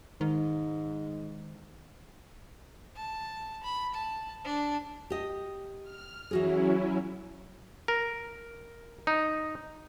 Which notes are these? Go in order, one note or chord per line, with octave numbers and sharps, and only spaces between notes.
G#2 D#3
A5
B5
A5
D4
G4 D#5
F6
E3 F#3 C#4 E4 F#4 G#4
A#4
D#4